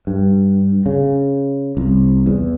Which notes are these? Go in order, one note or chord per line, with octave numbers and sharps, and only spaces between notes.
G2
C#3
C2
E2